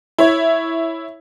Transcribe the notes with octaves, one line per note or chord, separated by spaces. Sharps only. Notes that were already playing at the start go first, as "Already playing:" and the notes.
E4 C#5